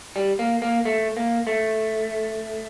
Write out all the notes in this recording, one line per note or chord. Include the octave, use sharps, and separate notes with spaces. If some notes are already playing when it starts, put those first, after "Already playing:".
G3
A#3
A#3
A3
A#3
A3